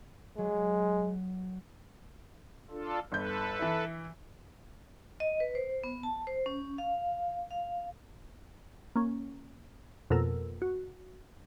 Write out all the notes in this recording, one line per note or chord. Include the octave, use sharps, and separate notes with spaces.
F#3 G#3
D4 F4 A4
G1 A4 B4 G6
E3 E4
D#5
B4
C5
B3
A5
C5
C#4
F5
F5
A#3 C#4
F2 B2 A#3 A4 A#4 E6
F#4